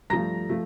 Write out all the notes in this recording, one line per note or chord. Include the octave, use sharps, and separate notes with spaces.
G2 F3 A3 A#5 A#6
F3 A3